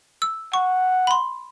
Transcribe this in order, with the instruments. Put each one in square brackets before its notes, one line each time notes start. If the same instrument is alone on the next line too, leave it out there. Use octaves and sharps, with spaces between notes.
[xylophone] E6
[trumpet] F#5 [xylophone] C#6
[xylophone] B5 C6